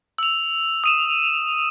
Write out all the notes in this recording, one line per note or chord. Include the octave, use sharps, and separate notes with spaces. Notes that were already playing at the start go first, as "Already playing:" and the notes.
E6 F7
D#6 D#7 E7